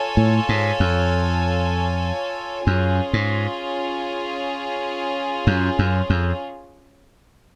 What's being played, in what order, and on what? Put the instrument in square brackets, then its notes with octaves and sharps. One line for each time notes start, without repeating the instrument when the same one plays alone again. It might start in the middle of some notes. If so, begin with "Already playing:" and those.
Already playing: [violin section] F4 A4 C#5 G#5
[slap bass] A2
G#2
F2
[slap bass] F#2 [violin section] C#4 F4 G#4
[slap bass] G#2
F#2
F#2
F2